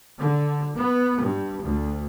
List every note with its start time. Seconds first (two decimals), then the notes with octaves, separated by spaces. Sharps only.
0.19 D3
0.77 B3
1.24 G2
1.63 D2